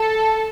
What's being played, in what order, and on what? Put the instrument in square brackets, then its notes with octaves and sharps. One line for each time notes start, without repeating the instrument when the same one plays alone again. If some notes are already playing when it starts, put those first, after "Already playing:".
Already playing: [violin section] A4 A5